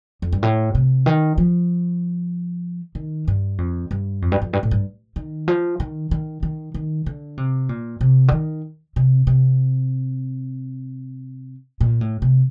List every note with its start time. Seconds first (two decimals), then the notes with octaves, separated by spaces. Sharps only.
0.22 F2
0.32 G2
0.43 A2
0.75 C3
1.06 D#3
1.38 F3
2.95 D#3
3.28 G2
3.58 F2
3.91 G2
4.22 F2
4.32 G2
4.42 F2
4.53 G2
4.63 A2
4.71 G2
5.16 D#3
5.48 F3
5.80 D#3
6.11 D#3
6.43 D#3
6.74 D#3
7.06 D3
7.37 C3
7.69 A#2
8.01 C3
8.28 D3
8.32 D#3
8.96 C3
9.27 C3
11.81 A#2
12.01 A2
12.22 C3